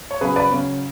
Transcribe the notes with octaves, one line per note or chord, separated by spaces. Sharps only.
C#5
C#3 F#3 C#4 G#4 B4
B4 D5
C#3 F#3 C#4